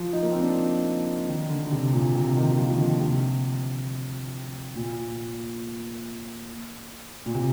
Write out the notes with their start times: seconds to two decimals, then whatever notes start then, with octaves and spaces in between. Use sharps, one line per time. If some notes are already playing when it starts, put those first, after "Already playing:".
Already playing: F3
0.13 D#4
0.22 A#3
0.32 C4
0.42 D4
1.28 D#3
1.50 D3
1.67 D3
1.71 C3
1.93 A#2
2.15 C3
2.37 D#3
2.52 D#3
2.59 F3
2.75 D3
2.80 D#3
3.01 C3
4.75 A#2
7.26 A#2
7.35 C3